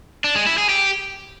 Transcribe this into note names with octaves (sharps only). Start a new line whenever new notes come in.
D4
G#3
E4
G#4
G4